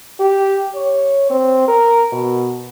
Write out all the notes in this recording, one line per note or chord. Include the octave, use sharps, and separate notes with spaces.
G4
C#5
C4
A#4
B2